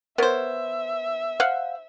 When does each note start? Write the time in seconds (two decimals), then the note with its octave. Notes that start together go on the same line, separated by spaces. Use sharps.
0.18 B3 A#4 C5 C#5 E5
1.40 C5 F5 F#5